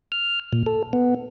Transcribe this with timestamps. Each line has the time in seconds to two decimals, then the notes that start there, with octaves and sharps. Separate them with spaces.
0.12 F6
0.53 A#2
0.66 A4
0.93 B3